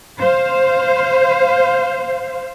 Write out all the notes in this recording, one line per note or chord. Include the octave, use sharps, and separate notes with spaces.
C5 F5